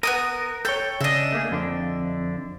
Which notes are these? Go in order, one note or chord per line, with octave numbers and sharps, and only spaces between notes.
B3 E4 A#4 D#6
A4 C#5 G5 G6
C#3 D4 D#5 E5
A3 A#3 G#4
F2 D3 D4